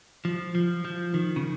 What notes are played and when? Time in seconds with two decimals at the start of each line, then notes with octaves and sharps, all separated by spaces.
0.25 F3
0.55 F3
0.85 F3
1.14 D#3
1.36 C#3